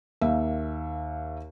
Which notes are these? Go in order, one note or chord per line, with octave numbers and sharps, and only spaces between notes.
D#2 A#3 E5